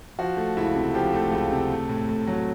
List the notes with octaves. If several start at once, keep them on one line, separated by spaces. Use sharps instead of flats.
F3 F#4
A3
C#2 E4
C3
F3 G4
A3
C#2
C3
A3
A2
A2
F#3